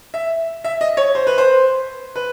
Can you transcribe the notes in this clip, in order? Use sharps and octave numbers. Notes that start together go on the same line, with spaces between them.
E5
E5
D#5
C#5
C5
B4
C5
B4